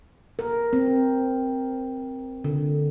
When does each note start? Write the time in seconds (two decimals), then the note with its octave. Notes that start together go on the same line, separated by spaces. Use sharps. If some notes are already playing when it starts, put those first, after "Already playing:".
0.39 A#4
0.73 C4
2.44 D3